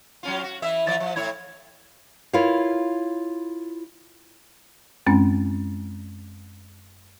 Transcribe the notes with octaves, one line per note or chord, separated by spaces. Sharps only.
F#3 C#4 F4
F#4
E3 E4 E5
E3 F3 D5
F3
A2 E4 C#5
E4 F4 A#4 C#5 F5
F#2 G#3 C4 C#4